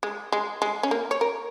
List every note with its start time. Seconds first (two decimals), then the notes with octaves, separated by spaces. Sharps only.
0.03 G#3
0.32 G#3
0.62 G#3
0.83 C#4
0.91 A#3
1.11 C#5
1.21 A#4